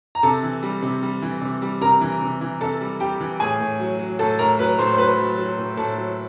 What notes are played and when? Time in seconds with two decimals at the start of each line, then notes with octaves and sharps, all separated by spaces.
0.15 A#5
0.23 C3 A4 A5
0.43 E3
0.63 G3
0.82 C3
1.03 G3
1.22 E3
1.42 C3
1.62 G3
1.81 C3 A#4 A#5
2.01 E3
2.21 C3
2.41 E3
2.61 C3 A4 A5
2.81 G3
3.00 G3 G4 G5
3.20 E3
3.40 A2 G#4 G#5
3.60 A2
3.80 F#3
3.99 F#3
4.19 A2 A4 A5
4.39 A2 A#4 A#5
4.59 F#3 B4 B5
4.78 A2 C5 C6
4.94 C6
4.98 F#3 B4 B5
5.18 F#3
5.38 F#3
5.58 A2
5.77 A2 A4 A5
5.97 F#3